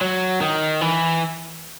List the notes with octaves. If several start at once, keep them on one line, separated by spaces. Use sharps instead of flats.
F#3
D#3
E3